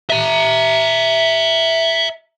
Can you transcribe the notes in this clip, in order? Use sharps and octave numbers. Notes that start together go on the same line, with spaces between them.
E5 A#5